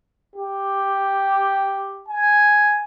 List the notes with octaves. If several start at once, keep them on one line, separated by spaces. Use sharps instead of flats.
G4
G#5